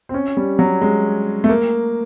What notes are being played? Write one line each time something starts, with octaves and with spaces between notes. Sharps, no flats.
C4
C#4
G3
F#3
G#3
A3
A#3